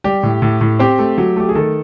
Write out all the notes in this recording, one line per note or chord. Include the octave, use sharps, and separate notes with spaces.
G3 G4
A2
A2
A2
C4 G4
A3
F#3
A3 G4
G#4
D#3 A4